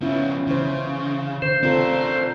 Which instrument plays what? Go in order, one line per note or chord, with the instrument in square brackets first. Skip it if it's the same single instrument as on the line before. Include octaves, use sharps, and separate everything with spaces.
[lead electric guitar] C#3 F3 [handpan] B3 C#4 E4
[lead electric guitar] C#3 [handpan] E3 E4 C5
[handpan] D3 [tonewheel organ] C5
[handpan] C4 F4 A4 [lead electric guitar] D4 A#4